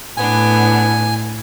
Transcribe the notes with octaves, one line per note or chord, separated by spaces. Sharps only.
A2 B3 D4 G#5